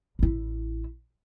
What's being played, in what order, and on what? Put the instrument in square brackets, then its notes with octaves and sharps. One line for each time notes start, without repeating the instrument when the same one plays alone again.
[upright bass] A1 E4